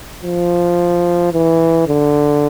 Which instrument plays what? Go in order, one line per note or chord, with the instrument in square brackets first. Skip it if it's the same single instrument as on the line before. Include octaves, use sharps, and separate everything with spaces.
[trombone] F3
E3
D3